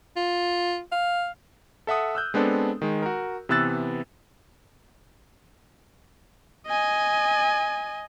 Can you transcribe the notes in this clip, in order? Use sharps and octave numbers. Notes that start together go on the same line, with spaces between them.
F4
F5
A4 E5 F#5 D#6
E6 F#6 G6
G#3 B3 C4 D4 A4
D#3 G#3
F#4 A#4
C3 E3 B3 E6 F#6 A6
D#5 G#5